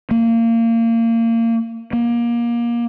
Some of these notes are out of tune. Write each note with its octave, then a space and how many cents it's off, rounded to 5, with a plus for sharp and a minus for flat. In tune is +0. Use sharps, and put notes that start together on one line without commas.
A#3 -25
A#3 +25